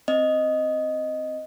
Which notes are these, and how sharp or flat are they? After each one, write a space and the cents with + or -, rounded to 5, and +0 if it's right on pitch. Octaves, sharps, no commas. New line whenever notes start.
C4 +0 D#5 +0